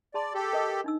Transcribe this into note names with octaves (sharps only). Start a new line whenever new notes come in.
G#4 D5 A5 C6
G4 A4
A#4 D#5 D#6
D4 D#4 E6